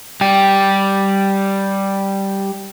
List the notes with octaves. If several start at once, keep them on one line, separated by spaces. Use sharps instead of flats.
G3 G4